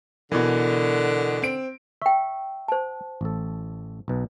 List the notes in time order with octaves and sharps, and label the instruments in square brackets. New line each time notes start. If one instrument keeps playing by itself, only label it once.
[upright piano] B2 E3 [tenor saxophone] D3 [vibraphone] A#4
[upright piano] C4 D7
[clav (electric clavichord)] E5 [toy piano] G5 C#6
[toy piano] C5 A5
[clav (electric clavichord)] A1 A4
B1 B2